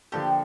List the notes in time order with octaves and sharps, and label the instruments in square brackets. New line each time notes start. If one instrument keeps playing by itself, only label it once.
[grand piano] D3 F3 A#3 D4 A4 [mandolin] G4